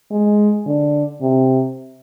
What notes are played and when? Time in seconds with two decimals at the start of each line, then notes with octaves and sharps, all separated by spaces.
0.11 G#3
0.66 D3
1.21 C3